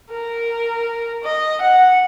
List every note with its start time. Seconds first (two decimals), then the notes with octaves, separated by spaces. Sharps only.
0.10 A#4
1.23 D#5
1.61 F#5